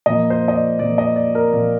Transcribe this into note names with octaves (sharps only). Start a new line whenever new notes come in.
A#2 F3 A#3 D#5
C5
D#5
D5
A#2 F3 A#3 D5
D#5
D5
A#4
A#2 F3 A#3 D5